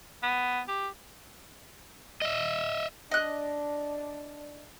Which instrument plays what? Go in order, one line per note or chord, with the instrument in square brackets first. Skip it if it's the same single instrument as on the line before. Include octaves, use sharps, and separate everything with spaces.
[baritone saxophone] B3
G4
[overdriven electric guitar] D#5 E5
[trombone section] D4 [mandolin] D#5 F#6